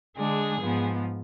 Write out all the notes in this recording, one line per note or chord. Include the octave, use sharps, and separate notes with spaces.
D3 G#3 D4 G#4
G#2 F3 B3